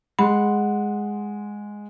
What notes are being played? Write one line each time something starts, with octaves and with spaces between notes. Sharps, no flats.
G#3 F#5 B5 C6